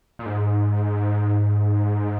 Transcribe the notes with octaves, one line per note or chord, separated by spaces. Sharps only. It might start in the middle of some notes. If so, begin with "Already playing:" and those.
A#2
G#2